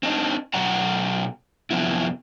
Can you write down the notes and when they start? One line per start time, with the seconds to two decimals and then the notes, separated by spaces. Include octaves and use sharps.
0.03 C4 D4 D#4
0.54 B2 F#3 D5 F#5 A#5
1.71 F#2 C3 D#3 F3 B3 E4